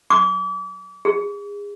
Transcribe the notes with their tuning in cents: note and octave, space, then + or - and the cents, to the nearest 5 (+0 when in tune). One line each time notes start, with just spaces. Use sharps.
D6 -40
G#4 -30